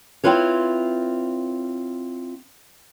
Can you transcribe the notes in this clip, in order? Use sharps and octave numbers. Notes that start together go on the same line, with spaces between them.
C4 E4 F4 B4 C#5